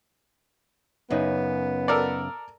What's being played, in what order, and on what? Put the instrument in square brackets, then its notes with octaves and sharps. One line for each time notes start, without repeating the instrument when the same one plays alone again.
[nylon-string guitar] F#2 C#3 D#4 [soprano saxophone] B3
[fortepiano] A4 A#4 D5